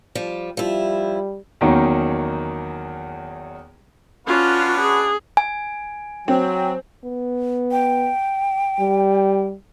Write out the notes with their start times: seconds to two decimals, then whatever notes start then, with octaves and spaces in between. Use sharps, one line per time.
0.15 F3 G3
0.57 F3 G3 E4
1.61 E2 D#3 F#3 A#3 C#4 D#4
4.27 C#4 D4 F4 F#4 B4
4.81 G#4
5.37 G#5
6.28 F#3 C4
7.05 B3
7.71 G5
8.80 G3